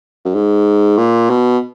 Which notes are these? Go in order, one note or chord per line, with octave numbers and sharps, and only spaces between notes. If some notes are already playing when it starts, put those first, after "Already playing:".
F#2
G#2
A#2
B2